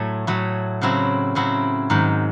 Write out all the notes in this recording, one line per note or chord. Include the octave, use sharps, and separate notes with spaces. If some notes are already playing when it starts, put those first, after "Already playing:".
Already playing: A2 F#3 A3
A2 F#3 A3
C#3 F#3 C4 E4
C#3 F#3 C4 E4
G#2 D#3 F#3